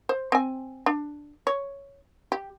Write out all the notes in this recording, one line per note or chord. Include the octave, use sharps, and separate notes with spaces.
C5
C4 G#5
D4
C#5
G4